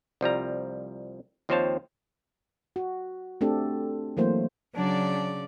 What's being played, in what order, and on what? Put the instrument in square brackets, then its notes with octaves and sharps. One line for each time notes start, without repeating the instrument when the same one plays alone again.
[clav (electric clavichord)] C2 F3 G3 A#5
D#2 F3 C4 C5 C#5 A5
[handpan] F#4
A3 C4 D4 G4 A4
E3 F#3 A3 A#3 C5
[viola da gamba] C#3 D5 [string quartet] F#3 D4